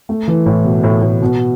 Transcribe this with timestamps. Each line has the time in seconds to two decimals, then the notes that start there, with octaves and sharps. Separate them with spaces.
0.09 A3
0.28 E3
0.46 A2
0.64 B2
0.83 A2
1.02 A2
1.22 B2